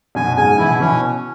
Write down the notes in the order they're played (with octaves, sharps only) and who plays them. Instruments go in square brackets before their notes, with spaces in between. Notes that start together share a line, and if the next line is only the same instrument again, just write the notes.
[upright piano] F#2 B2 [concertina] G#5
[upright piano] G#2 C#3 [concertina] G#5
[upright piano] B2 E3 [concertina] E4
[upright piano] B2 E3 [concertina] C#4